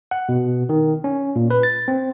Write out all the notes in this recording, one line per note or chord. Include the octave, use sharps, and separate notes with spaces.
F#5
B2
D#3
C#4
A#2
B4
A6
C4